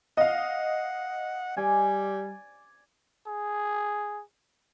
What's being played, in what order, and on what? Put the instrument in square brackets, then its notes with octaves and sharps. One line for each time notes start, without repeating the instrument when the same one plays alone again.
[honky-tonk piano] D#5 F5 [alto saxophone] F#5
[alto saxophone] G3 [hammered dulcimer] D5 G#5
[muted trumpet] G#4